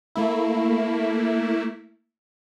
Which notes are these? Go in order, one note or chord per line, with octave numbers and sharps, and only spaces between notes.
A3 A#3 E4